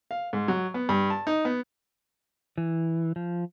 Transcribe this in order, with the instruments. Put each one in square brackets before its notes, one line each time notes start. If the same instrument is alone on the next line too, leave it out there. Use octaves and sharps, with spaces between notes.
[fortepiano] F5
G#2
F#3
B3
G2
A5
D#4
B3
[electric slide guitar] E3
F3